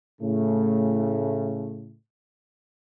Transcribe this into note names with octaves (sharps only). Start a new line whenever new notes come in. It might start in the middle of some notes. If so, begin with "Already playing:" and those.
A2 C#3 A3